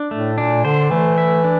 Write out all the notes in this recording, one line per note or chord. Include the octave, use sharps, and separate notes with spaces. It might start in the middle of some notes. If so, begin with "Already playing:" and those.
Already playing: D4
A2 A3
A#2 D4
D3 C5
E3 A3
E5
D4